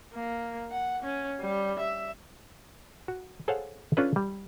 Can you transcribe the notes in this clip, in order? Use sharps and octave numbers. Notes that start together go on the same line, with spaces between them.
A#3
F#5
C#4
G3
E5
F#4
G#4 A4 C5 C#5 F5 F#5
C#4 D4 F4 A4 B4
G3